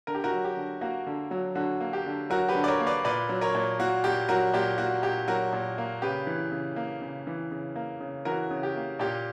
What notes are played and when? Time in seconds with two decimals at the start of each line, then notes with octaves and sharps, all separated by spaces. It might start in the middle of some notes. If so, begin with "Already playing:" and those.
0.07 D3 A#4
0.15 G4
0.24 F#4 A#4
0.33 F#3
0.44 G4
0.57 D3
0.81 A#3 F#4
1.07 D3
1.31 F#3
1.55 D3 F#4
1.81 A#3
1.93 G4
2.06 D3
2.30 F#3 F#4 A#4
2.48 G4 B4
2.55 D3
2.64 D5
2.68 A#4 C#5
2.80 A#3
2.86 B4 D5
3.05 A#2 B4 D5
3.29 F#3
3.41 A#4 C#5
3.55 A#2
3.79 A#3 F#4
4.04 A#2 G4
4.29 F#3 F#4 A#4
4.54 A#2 G4
4.78 A#3 F#4
5.03 A#2 G4
5.28 F#3 F#4 A#4
5.53 A#2
5.78 A#3
6.02 C#3 G4 B4
6.27 E3
6.52 C#3
6.76 A#3
7.01 C#3
7.27 E3
7.51 C#3
7.76 A#3
8.00 C#3
8.25 E3 F#4 A#4
8.51 C#3
8.63 G4
8.76 A#3
9.00 A#2 G4